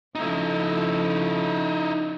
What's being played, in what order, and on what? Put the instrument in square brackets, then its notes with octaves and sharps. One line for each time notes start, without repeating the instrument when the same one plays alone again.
[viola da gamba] C#3 F3 A3 [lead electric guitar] D#4 E4